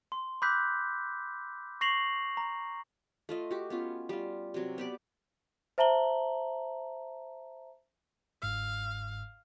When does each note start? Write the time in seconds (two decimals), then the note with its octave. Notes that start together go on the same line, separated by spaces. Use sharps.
0.12 C6
0.42 B5 D6 E6 F#6 G6 B6
1.81 C#6 A#6 C7 F7 F#7
2.37 A#5
3.29 A3 F4 D#5
3.51 F#4 G4
3.70 B3 C#4 F4
4.09 G3 F4
4.54 C3 F#3
4.78 B3 G4 D5
5.78 C5 E5 A5 A#5 F#7 G7
8.42 G1 G#2 F5 E6